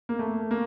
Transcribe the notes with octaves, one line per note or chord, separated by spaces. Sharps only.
A#3
A3
A#3